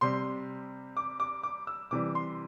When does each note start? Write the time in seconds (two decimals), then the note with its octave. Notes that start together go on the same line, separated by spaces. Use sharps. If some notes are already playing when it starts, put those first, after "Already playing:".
0.01 C3 G3 C6
0.97 D6
1.20 D6
1.43 D6
1.67 E6
1.91 C3 E3 G3 D6
2.15 C6